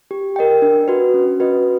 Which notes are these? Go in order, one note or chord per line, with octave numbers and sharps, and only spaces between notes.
G4
A#4 D#5 G5
D4
F#4 B4
C#4
F#4 B4 D#5